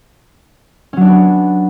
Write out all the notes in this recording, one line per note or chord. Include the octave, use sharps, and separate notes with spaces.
F#3 B3 C#4 D4 F#4